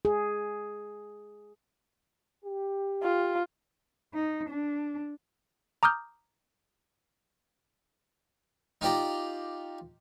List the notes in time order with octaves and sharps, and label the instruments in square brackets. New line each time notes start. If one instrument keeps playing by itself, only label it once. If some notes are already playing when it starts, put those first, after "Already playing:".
[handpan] G#4
[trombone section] G4
[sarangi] F4
[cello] D#4
D4
[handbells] A#5 D6 D#6 F6 G6
[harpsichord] D#4 F4 G4 D5 G5 A#5